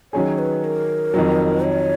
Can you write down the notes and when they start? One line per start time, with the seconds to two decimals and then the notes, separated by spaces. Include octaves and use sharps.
0.13 D#3 F#3 C#4 G#4 C#5
0.39 B4
0.64 A#4
1.14 F2 D#3 F#3
1.64 C#5